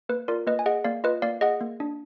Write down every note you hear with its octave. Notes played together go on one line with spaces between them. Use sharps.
A#3 B4
F4 A#4 D5
A#3 B4 D#5
G#5
G#4 D#5 F#5
A#3 D5 F5
F4 B4 D#5
A#3 D5 F5
G#4 D#5 F#5
A#3
D4